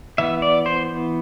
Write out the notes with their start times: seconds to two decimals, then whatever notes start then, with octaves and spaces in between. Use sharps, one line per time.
0.18 E3 B3 E5
0.42 D5
0.66 C5